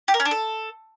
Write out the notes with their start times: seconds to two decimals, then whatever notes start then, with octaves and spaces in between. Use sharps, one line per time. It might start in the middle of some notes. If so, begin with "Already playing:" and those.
0.08 G4
0.14 A#4
0.20 C#4
0.25 D4
0.31 A4